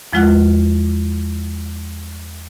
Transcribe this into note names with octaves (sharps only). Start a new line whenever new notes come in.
E2 F3 G#3 F4 F#5 F#6